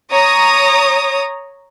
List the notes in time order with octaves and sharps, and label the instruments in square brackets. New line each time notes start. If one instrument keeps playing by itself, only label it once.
[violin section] C#5 A#5 D#6